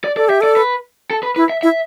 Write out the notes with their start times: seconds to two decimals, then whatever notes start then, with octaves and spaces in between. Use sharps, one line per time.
0.04 D5
0.17 A4 D5
0.29 G4 E5
0.41 A4 D5
0.57 B4
1.11 A4
1.23 B4
1.36 E4 B4
1.50 E5
1.63 E4 E5